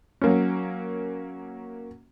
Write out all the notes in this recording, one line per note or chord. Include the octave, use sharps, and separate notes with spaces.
F#3 A#3 C#4